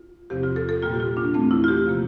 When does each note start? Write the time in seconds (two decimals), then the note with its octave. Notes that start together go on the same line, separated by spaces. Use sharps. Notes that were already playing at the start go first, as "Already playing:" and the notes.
Already playing: F4
0.30 E2 C3 F3 C4 G4
0.43 F4
0.56 A4
0.69 A4
0.82 A#2 G3 A#3 F4
0.94 G4
1.00 F4
1.17 D4
1.34 E2 E3 A3 C4 D4
1.51 E4
1.64 F4
1.68 G4
1.85 C3 F3 A#3